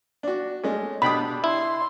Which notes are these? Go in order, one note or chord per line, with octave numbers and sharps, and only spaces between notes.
D4 F#4
G#3 A3 C#4
B2 D4 G4 G5 B5 D#6
E4 C6